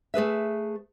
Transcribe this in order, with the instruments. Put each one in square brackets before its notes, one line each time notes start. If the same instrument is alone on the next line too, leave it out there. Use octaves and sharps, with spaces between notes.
[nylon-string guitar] A3 G#4 B4 E5